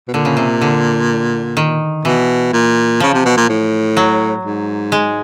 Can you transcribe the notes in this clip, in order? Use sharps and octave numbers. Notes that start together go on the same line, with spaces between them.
B2
A#2 D3
C#3
C3
D3
D#3
B2 E3
A#2
C#3 F3
C3
B2
A#2
A2
F#3
G#2
G#3